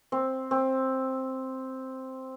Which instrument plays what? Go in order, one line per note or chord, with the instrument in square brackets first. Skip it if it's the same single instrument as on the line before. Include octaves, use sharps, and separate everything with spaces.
[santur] C4
C4